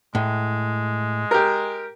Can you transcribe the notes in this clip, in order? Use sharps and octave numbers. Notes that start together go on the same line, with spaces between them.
A2 G#3
G4 A#4